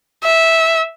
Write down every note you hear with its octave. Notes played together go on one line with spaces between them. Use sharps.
E5